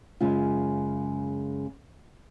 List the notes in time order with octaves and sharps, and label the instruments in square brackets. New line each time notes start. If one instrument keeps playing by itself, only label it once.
[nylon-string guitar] F#2 C#3 G#3 F4